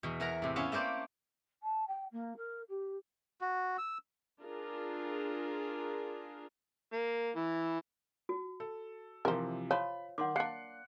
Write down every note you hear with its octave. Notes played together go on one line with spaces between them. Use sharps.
E2 B2
E3 A#4 F#5 A#5
A2 C3
B3 C#4 E4 C#5 F5 A5
A3 A#3 A4 C5 D5
A5
G5
A#3
A#4
G4
F#4
E6
D4 F4 G#4 A#4
A#3
E3
F#4
A4
C3 E3 F3 A#4 C5
F3 C#5 B5
D#3 F#5 C6 D6
A#3 D4 F#6 C7 C#7